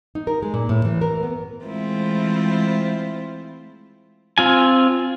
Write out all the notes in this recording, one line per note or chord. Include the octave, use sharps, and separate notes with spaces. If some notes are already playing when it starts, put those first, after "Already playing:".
D#4
A#4
G#3
A#2
A2
E3
A#4
B3
E3 G#3 A3 C4 E4 F4
C4 F4 G#5